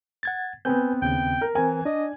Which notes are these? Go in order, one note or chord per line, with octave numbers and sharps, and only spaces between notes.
F#5 G#6 A6
B3 C4 B4 G#5 G6
D#2 C#3 G5 G6
A#4
E3 C4 A#4 G#5
D4 D5 D#5